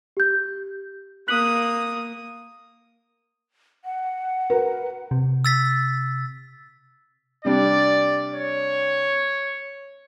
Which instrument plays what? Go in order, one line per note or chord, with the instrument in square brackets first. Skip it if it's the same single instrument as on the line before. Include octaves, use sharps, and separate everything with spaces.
[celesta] G4 G6
[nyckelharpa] A#3 D#6 [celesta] F#6 B6 F#7
[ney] F#5
[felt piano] F#4 A#4 B4
[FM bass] C3
[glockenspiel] E6 A6 B6
[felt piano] C3 G3 D4 [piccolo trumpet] D5
[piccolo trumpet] C#5